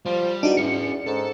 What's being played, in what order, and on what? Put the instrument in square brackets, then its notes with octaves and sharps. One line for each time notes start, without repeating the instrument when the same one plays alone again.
[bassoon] F3 [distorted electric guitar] G3
[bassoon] E2 [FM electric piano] D4 D#4 F#4
[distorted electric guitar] C#4 E5 [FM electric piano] C#7
[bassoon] G#2 [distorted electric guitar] A4